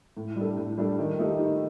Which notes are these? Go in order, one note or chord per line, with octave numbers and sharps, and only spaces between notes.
A2
G3 D4 A4
A2
G3 D4 A4
D#3
A3 D#4 G4
D#3